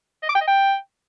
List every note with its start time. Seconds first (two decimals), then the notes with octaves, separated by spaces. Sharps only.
0.23 D#5
0.29 D6
0.35 G5
0.41 D#5
0.47 G5